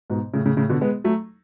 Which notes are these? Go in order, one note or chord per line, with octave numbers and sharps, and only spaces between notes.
G#2 B2
A2 C#3
A2 C#3
A2 C#3
B2 D3
G#3 B3
F#3 A3